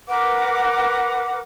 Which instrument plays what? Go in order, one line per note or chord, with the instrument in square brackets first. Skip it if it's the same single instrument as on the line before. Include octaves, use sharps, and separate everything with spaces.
[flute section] A#4 B4 F#5 D6